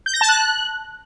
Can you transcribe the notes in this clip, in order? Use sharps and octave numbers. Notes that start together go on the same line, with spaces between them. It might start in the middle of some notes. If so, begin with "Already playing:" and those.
G6
A#6
A5
F#6